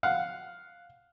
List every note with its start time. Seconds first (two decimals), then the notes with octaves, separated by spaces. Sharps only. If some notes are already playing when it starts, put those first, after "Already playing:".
0.03 F5 F#5